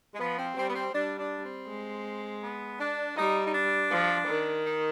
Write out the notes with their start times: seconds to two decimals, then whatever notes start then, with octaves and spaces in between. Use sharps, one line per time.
0.14 G#3
0.19 F3 B3
0.38 C4
0.57 G3 C4
0.68 B3
0.75 C4
0.93 G3 D4
1.19 D4
1.43 C4
1.68 G#3
2.42 B3
2.80 D4
3.17 G3 D#4
3.46 D#4
3.54 D4
3.91 F3
4.28 D#3
4.65 D#4